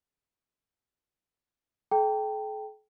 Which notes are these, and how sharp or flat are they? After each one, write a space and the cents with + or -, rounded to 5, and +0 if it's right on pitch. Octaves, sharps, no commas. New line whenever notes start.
A4 -45 G5 +0 A#5 -45